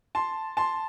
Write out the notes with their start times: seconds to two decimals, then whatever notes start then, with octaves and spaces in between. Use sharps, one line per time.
0.15 A5 C6
0.57 A5 C6